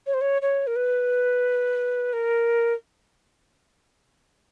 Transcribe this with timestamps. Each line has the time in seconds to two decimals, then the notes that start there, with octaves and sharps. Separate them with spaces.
0.06 C#5
0.14 C5
0.21 C#5
0.42 C#5
0.67 A#4
0.76 B4
2.13 A#4